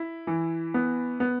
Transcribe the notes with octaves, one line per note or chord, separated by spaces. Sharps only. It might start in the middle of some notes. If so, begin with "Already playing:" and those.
Already playing: E4
E3
B3
B3